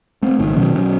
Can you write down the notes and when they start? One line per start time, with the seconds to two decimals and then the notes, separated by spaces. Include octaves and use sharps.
0.22 A3 C4
0.39 G#1 C#2 D#3
0.56 B2 D#3 F#3 C#4
0.75 B1 F#3 C#4